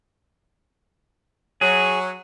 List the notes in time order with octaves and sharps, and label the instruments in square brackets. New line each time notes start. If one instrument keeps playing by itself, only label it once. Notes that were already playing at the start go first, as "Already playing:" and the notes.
[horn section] F#3 [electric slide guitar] G#4